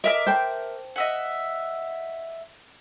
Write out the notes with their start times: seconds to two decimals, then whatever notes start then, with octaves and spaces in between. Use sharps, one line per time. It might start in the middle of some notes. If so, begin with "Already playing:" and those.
0.04 A#4 D#5 E5 D6
0.27 C5 G5 A5
0.96 D#5 E5 F#5